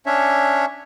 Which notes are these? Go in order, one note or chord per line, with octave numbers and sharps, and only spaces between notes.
C#4 D4 C#5 E5